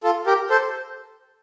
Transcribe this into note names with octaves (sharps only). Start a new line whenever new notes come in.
F4 A4
G4 A#4
A4 C5